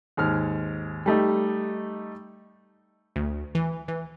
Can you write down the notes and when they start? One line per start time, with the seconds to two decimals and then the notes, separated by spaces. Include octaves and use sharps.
0.17 D#2 G#2 F6
1.06 G3 A3 D#4
3.16 D2
3.55 E3
3.88 E3